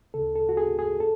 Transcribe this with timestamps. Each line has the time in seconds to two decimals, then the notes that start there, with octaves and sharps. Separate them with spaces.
0.14 D2 C#3 A4
0.35 A4
0.49 F#4
0.57 G#4
0.79 G#4
1.00 A4